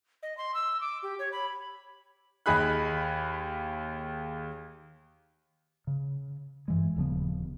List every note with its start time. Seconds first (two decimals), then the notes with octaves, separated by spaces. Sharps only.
0.23 D#5
0.37 C6
0.54 E6
0.81 D6
1.03 G4
1.19 C#5
1.32 B5
2.46 D#2 D#4 G#4 B5 F#6
5.87 C#3
6.68 G2 E3 G#3
6.97 D#1 C#3 F3 B3